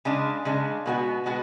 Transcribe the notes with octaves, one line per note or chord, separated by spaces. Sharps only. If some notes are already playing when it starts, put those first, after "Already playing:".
C#3 G#3 D4
C#3 G#3 D4
B2 G#3 B3 F#4
B2 G#3 B3 F#4